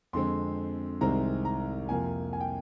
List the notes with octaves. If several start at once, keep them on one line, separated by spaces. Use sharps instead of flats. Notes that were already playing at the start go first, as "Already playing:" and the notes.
F2 D3 G#3 C4 C6
C2 C3 D#3 G#3 C4 A#5
A#5
F2 C3 F3 A#3 G#5
G#5
G5